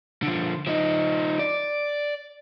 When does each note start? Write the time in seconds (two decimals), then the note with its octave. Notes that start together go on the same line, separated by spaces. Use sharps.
0.23 D3 F3
0.67 F3 D#4
1.39 D5